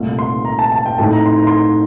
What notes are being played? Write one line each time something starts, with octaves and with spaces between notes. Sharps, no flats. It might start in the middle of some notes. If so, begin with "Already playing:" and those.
Already playing: C2 A#2 A3
C6
A#5
A5
A5
G5
A2 A3 C4 D#4 A5
A#5
C6
A#5
C6
A#5